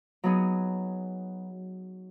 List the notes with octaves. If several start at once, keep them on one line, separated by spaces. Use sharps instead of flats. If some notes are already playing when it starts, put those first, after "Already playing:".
F#3 B3 D#4 G#4